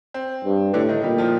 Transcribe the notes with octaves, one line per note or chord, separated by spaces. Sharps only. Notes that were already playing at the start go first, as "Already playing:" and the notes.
C4
G2
A2 D3 D4
D#3 D#4
A#2 G3 G4
F3 F4